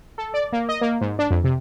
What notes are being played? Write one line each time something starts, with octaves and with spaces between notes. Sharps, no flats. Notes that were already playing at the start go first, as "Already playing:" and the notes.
A4
D5
A#3
D#5
A#3
G#2
D4
F2
C3